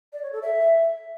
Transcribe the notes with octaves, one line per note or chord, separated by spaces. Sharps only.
D5
C#5
A4
E5